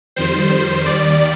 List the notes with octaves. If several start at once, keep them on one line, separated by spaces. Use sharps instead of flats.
F2 D#3 G3 C5
D#2 D#3 G3 D5